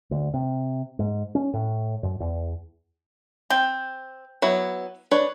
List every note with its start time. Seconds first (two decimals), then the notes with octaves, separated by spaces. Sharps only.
0.11 D2
0.34 C3
0.99 G#2
1.35 C#4
1.53 A2
2.03 F#2
2.20 E2
3.50 C4 G5
4.42 F#3 B3 E4
5.11 D4 B4 C#5